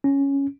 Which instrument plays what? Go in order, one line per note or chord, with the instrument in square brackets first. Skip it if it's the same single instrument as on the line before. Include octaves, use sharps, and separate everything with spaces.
[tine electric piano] C#4